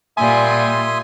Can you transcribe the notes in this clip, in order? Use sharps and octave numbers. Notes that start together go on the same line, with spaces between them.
A#2 G3 F4 E5 G#5 C6 D#6